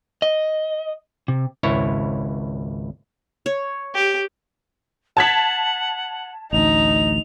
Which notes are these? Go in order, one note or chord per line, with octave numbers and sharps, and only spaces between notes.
D#5
C3
G#1 C#2 E4 C#5
C#5
G4
F#5 A5 G#6 B6
A1 D2 D#4 F7